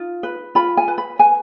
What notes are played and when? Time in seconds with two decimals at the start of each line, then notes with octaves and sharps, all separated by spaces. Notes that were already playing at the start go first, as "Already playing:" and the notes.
Already playing: D#4 F4
0.23 B4
0.55 F4 B5
0.77 G#5
0.88 B4
0.98 B5
1.19 B4 G#5